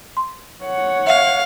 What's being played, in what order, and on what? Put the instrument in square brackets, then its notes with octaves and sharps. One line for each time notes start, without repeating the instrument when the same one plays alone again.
[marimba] C6
[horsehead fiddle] C#5 F#5
[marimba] E5 [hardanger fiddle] F5